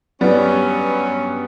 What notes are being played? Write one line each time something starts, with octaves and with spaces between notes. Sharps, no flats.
G2 F#3 G3 B3 C#4